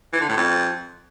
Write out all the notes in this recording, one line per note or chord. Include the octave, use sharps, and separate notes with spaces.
E3
D3
A2
F2